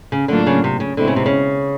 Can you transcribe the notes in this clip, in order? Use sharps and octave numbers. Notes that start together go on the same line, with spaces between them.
C#3
A2 D3 F#3 A#3 D4 F4
C#3
C3
C#3
B2 D3 G#3 C4 E4
C#3
C3
C#3